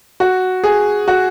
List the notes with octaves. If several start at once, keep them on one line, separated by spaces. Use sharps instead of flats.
F#4
G#4
F#4